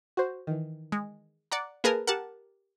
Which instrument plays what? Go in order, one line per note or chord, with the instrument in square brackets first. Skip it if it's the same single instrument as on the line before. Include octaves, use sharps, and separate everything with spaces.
[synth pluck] F#4 C5
D#3 E3
[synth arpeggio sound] G#3
D5 F#5 A#5
[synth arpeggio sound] A#3 G#4 A#4 [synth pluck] B4 A5
[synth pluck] G4 A#4 [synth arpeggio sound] F#5 A5